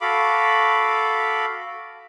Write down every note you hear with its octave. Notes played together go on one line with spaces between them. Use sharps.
F#4 A4 F5 B5 D6